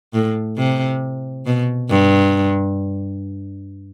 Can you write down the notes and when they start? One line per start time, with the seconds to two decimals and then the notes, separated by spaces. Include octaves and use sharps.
0.14 A2
0.58 C3
1.46 B2
1.90 G2